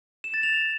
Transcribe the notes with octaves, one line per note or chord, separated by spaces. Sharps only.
E7
A6
F7